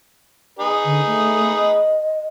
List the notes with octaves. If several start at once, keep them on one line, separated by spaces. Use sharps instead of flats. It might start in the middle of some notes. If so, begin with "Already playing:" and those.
D#4 G#4 B4
D3
A3
D#5